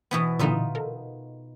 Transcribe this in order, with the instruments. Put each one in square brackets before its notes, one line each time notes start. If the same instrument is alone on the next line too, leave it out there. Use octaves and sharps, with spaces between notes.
[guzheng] B2 E3 B3
[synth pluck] A#2 D3 E3 [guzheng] D#4 F4 E5
[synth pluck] A4 A#4